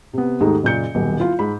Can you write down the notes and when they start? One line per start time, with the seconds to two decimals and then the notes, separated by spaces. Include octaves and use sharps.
0.13 C3 B3
0.41 D#2 G#2 A3 D#4
0.63 F#1 A#2 G6 C#7
0.95 D#1 B1
1.20 E4 F4
1.39 G#2 B5